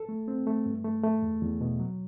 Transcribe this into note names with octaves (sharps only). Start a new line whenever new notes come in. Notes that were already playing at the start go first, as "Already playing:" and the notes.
Already playing: A4
A3
C4
A3
G2
A3
A3
E2
E2
B2
F#3